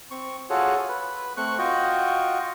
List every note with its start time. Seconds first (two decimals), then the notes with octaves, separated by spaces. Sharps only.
0.11 C4 C#6
0.50 F4 F#4 G#4 A4 C#5 F#5
0.88 B4
1.37 A3 C4 C#6 F#6
1.59 F4 F#4 D#5 G5 C#6